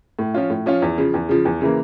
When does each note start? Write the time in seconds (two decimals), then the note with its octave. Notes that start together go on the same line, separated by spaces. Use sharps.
0.19 A2
0.34 F3 C#4 F4
0.50 A2
0.66 F3 C#4 F4
0.82 E2
0.98 C#3 F3
1.14 E2
1.29 C#3 F3
1.45 E2
1.61 C#3 E3 A#3